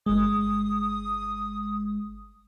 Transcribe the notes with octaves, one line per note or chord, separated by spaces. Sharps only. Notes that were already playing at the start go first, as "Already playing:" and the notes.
G1 G#3 D#6